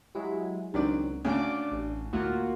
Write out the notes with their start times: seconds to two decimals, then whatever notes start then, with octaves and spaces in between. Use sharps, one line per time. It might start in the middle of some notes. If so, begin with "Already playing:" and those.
0.15 F#3 G#3 E4 G4
0.74 C#2 D#3 F#3 C4 D4 D5
1.25 D2 C#3 D5 D6
1.71 A1
2.13 D2 A2 A#3 F4 F#4